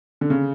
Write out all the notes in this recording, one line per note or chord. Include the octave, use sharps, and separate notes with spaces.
D3
C#3